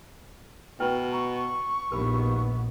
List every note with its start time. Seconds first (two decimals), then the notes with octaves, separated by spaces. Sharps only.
0.80 B2 E4 B4 G5
1.12 A#5 C#6
1.92 A#1 D#2 B3 A#4 B5